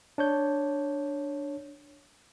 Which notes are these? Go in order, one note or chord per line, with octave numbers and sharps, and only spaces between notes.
D4 C#5 G6